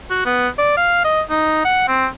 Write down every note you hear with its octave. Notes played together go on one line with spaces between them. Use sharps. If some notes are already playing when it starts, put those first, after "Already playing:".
F#4
B3
D5
F5
D#5
D#4
F#5
C4